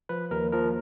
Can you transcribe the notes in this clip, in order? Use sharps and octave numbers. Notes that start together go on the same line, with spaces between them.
F3 B4
D#2 A#4
F3 A#4